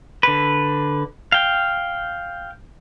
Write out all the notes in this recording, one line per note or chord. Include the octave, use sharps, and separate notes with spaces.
D3 B4
F5 G5